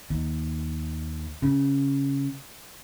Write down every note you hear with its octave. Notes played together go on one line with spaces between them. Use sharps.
D#2
C#3